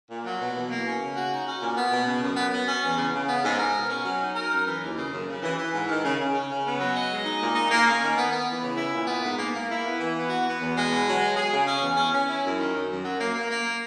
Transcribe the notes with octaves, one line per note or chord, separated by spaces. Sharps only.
A#2
F#3
B2
E3
A#3
C#4
C#3
F#4
D#4
C#4
A#2
B3
B2
C#3
F#2
B3
B3
C#4
E2
C#3
C#3
B3
G#2
A#4
B2
C#4
F#3
D#4
A#4
F#2
E3
D#2
C#3
F#2
C#3
E3
E3
G#2
D#3
C#3
C#3
C#4
C#3
B3
F#3
D#5
G#3
D#4
A#2
D#4
A#3
C#4
D#3
B3
B3
E3
C#3
E4
A#2
B3
G#2
A#3
A#3
E4
B3
E3
B3
F#4
B3
E2
G#3
B2
F#3
G#3
G#4
C#3
C#4
E2
C#4
C#4
E4
F#2
D#3
F#2
F#2
F#3
A#3
A#3
A#3